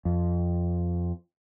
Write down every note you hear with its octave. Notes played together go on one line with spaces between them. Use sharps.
F2